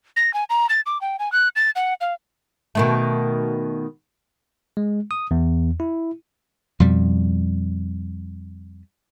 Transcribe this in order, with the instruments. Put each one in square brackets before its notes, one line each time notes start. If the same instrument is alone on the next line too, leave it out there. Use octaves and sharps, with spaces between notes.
[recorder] A#6
G#5
A#5
A6
D6
G5
G#5
F#6
A6
F#5
F5
[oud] B2 D#3 A3
[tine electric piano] G#3
D#6
E2
E4
[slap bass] F2 B2 G3